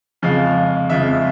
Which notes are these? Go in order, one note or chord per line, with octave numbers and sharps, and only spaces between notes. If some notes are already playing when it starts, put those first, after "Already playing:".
F2 C#3 F3 G#3 F5
F2 C#3 F3 G#3 E5